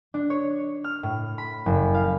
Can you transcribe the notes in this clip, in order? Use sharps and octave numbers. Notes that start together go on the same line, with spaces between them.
D4
C#5
F6
A2
B5
F#1
F5